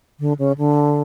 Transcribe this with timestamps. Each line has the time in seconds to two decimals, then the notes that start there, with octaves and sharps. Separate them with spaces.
0.20 D3
0.39 C#3
0.58 D3